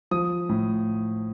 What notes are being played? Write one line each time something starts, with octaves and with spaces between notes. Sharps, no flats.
F3 D#6
A2